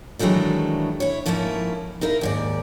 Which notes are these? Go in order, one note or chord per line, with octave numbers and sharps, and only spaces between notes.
D#3 E3 F#3 G#3 A3 D4
E4 C#5
G#2 F3 A3 A#3 C#4 E4
D#4 E4 A#4 F5
D#2 G#2 D5